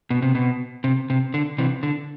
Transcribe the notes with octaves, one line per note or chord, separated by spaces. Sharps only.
B2
C3
B2
C3
C3
D3
C3 E3
D3